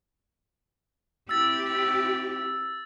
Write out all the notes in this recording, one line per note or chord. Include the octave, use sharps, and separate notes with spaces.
C4 E4 G4 E6 A6